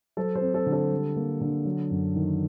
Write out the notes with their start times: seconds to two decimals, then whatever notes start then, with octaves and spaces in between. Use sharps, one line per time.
0.17 F#3 A4 C5
0.35 A4 C5
0.41 C4
0.54 A4
0.66 D3
0.73 A4
0.91 G3
1.16 A#3
1.41 D3
1.65 F#3
1.91 F#2
2.16 D#3